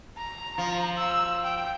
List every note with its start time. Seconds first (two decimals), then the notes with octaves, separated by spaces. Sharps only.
0.17 A#5
0.58 F3
0.97 E6
1.44 G5